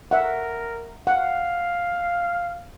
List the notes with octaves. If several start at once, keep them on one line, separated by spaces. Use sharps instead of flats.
A#4 E5 F#5
F5 F#5